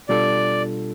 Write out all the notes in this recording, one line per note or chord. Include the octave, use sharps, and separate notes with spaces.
B2 G3 D4 F4 A4 D5